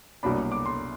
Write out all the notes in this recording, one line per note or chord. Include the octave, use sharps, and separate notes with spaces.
C2 B2 F#3 A#3 D4 B5
D6
C6